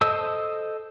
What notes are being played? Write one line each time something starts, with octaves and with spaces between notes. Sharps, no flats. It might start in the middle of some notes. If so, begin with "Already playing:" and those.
A4 C5 D#5 E6